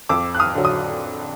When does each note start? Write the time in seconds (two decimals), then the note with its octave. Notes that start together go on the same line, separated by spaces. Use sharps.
0.09 F2 D6 E6
0.35 F#6
0.40 D#6 F6
0.55 D3 F#3
0.65 D#6